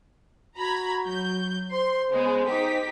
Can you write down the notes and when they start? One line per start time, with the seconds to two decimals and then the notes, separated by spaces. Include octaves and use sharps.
0.57 F#4 A#5 B5 G#6
1.04 F#3 G6
1.72 C5 C6
2.11 C#3 G#3 B3
2.47 D#4 G4 B6